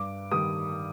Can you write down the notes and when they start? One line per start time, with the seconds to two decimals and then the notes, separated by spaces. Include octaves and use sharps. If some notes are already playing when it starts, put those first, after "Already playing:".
Already playing: G2 D6
0.31 D#3 G3 D#6